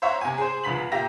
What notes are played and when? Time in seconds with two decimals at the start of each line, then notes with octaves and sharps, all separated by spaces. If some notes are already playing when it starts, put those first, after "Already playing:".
0.02 C5 C#5 E5 F#5 A#5
0.21 C3 G#5
0.38 G#4 C5
0.63 F1 C#2 B5 B6 F#7
0.92 A#2 G4 E5 A#5 A#6